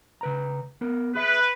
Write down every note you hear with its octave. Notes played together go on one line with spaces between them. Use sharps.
C#3 B4 A#5
B3 A#4
G#4 B4 E5